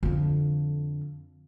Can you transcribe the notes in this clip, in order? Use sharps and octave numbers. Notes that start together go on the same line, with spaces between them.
F2 D3